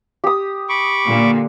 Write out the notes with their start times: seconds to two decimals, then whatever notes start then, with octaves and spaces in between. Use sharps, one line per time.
0.24 G4 D#6
0.69 B5 C#6 D6
1.06 A#2 D3